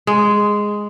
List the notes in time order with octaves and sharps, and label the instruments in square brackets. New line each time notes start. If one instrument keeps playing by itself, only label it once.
[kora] G#3